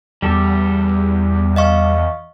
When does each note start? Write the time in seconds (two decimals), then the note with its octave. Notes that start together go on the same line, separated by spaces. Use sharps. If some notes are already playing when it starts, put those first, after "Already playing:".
0.22 E2 G3 G4 A4
1.56 D#5 F5 C#6